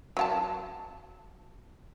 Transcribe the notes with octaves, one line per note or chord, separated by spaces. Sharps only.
F#3 F4 A5